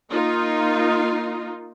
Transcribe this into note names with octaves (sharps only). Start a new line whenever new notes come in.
A#3 D#4 F4